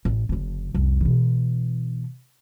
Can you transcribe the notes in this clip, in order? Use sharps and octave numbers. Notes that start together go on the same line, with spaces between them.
A1
F#1 D3
C2 F2
B2 E3